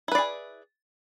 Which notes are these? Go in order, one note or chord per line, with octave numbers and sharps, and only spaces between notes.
E4 G#4 B4 D5